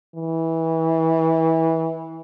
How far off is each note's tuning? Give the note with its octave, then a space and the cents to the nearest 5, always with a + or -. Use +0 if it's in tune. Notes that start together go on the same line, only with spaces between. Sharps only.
E3 -25